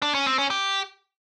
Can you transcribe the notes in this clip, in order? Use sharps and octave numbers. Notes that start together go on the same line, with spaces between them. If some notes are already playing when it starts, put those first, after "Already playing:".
D4
C#4
C4
C#4
G4